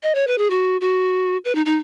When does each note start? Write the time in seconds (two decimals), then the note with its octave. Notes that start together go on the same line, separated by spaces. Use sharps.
0.03 D#5
0.15 C#5
0.27 B4
0.38 G#4
0.50 F#4
0.81 F#4
1.45 B4
1.55 D#4
1.66 D#4